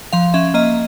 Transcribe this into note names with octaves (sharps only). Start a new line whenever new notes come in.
F3 F5
C#4 E5
A#3 D#5